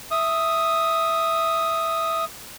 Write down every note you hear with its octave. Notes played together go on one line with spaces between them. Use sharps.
E5 D#6